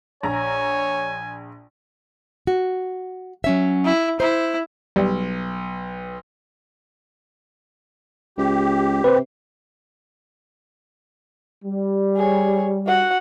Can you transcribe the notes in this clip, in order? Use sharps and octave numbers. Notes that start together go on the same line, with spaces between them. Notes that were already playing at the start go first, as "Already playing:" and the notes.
A#1 C#5 G#5 A#5
F#4
F#3 C#4 E5
E4
E4 C5
B1 G3
C#2 G4
C3 B4 C5
G3
G#4 C#5
F#4 F#5